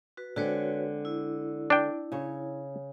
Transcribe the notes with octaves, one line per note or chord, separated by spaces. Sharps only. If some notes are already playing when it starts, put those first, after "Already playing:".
F#4 B4
D3 G#3 C4 F#4 B4 C#5
E4
D4 G5
C#3 C#5